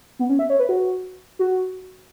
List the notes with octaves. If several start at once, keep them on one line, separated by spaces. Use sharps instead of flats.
B3
C#4
E5
C#5
B4
F#4
F#4